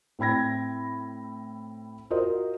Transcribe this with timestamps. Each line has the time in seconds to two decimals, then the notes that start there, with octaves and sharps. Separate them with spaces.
0.19 A2 C4 B5 G#6 A#6
2.10 F4 F#4 A#4 C5 D#5